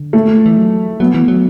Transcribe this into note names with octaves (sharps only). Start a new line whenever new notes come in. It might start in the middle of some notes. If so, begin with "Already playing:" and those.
Already playing: D3
A3
E3
F#3
F#3 B3
E3
F#3